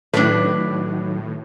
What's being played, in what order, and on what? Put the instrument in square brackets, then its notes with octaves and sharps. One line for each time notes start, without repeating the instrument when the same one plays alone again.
[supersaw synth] A2 [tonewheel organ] D#3 F#3 [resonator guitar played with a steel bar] D4 B4